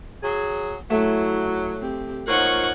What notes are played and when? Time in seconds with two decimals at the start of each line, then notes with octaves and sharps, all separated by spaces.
0.23 F#3 G#4
0.90 F#3 A3 E4
1.79 C4 G4
2.28 A#2 F3 D#4 A#4 C#5 F#5 C#6